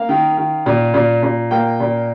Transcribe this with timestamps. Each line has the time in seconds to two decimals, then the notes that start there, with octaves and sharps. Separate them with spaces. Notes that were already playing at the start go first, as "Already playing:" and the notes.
Already playing: A#3 F5
0.09 D#3
0.37 D#3
0.66 A#2
0.94 A#2
1.23 A#2
1.51 A#3 G5
1.80 A#2